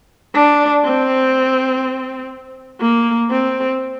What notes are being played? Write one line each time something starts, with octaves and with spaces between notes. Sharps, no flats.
D4
C4
A#3
C4